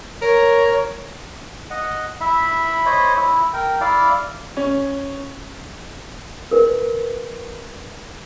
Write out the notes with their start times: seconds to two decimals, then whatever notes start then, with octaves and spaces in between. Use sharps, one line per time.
0.22 A#4 C#5
1.71 D#5 F#5
2.21 E4 E5 B5
2.86 C5 C#5 D#5 B5
3.16 E4
3.53 A#4 G5
3.81 E4 D5 F5
4.57 C#4
6.51 A#4 B4